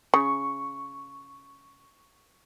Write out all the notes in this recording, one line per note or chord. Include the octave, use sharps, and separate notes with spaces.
C#3 C#6